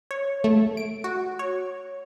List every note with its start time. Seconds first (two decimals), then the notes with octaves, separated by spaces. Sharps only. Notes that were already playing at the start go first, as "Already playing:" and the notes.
0.11 C#5
0.44 A3
0.77 D7
1.04 F#4
1.39 C#5